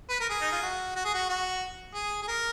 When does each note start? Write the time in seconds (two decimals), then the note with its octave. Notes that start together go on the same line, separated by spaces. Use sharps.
0.09 B4
0.20 A#4
0.29 G#4
0.41 D#4
0.52 F4
0.62 F#4
0.95 F#4
1.05 G#4
1.14 F#4
1.29 F#4
1.94 G#4
2.22 G#4
2.28 A#4